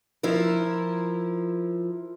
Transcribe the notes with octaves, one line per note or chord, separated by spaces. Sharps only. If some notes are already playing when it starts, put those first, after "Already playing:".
F3 E4 A#4